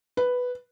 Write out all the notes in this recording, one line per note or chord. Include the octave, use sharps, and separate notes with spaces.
B4